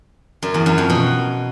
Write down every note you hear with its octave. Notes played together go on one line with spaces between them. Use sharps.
F#2
E2
F#2
F2
B2